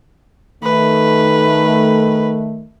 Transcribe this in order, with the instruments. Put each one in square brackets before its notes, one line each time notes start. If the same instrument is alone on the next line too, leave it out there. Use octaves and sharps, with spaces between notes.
[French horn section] D#3 A3 [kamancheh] B4